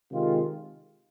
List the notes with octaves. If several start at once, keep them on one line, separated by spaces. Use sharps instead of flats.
C3 D#3 G#3 C4 F4